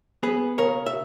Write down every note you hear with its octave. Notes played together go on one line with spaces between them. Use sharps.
B3 G#4 B4
C#3 A#4 C#5
E5